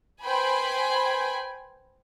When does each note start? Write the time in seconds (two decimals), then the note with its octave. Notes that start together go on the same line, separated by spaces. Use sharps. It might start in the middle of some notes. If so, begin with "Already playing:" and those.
0.23 B4 C5 G5 G#5 B5